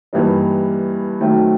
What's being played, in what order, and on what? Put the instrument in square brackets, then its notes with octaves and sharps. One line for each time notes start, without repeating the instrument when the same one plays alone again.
[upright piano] G2 E3 G3 A#3 D#4
D#3 F#3 A3 C4